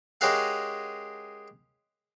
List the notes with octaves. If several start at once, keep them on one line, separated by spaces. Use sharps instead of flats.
G#3 C#4 G4 A#4 F5 F#5